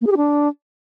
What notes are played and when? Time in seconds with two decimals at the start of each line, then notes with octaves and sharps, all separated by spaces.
0.01 A#3
0.06 G#4
0.12 G4
0.17 D4